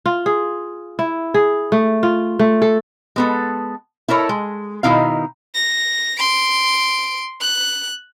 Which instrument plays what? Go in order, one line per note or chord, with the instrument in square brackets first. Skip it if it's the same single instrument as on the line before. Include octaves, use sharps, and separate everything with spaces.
[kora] F4
G#4
E4
G#4
A3
F4
A3
A4
[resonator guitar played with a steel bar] G#3 B3 A4
E4 A4 A#4 C#5
G#3
B2 D#3 D#4 E4 F5
[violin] A#6
C6 D7
F#6